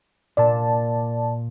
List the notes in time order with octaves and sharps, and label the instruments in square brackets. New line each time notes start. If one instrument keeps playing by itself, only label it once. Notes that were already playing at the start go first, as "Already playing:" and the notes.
[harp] A#2 [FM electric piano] D5 A5